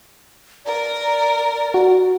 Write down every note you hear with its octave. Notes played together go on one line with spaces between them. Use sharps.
A#4 D5
F#4